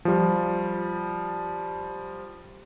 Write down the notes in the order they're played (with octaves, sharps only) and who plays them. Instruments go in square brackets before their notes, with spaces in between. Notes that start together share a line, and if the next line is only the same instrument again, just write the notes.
[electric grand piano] F3 G3